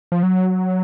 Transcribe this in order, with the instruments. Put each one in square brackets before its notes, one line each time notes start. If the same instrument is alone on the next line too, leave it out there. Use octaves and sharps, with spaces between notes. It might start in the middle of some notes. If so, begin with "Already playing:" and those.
[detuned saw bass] F3
F#3